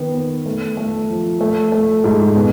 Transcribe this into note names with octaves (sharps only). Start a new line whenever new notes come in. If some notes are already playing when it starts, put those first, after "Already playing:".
Already playing: D#3 B3
B3
A3
A3
F3
A3
A3
G#2
B2